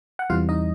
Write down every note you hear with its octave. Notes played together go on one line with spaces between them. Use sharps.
F#5
E2 C3 E3 G3 F4 F5
D#4 D#5